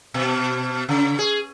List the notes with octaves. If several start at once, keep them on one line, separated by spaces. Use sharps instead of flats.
B2
C#3
G#4